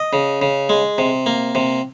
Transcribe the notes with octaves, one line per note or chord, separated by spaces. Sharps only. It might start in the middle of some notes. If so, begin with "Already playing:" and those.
Already playing: D#5
C#3
C#3
G#3
C3
A#3
C3